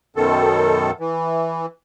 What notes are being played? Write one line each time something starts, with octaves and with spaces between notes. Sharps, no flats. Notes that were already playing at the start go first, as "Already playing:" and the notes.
F#2 B2 D#3 A4
E3